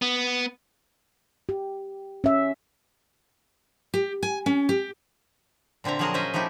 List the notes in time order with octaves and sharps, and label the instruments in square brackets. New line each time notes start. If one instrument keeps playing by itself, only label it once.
[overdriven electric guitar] B3
[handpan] G4
C#4 E5
[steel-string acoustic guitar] G4
G#5
C#4
G4
[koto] A#2 D3 C4 E5 A#5
F3 F#3 F#4 G#4 A#4 F#5
C#4 C5 D#5 E5
F3 A3 D#4 E4 G4